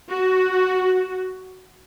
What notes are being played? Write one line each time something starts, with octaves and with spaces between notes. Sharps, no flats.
F#4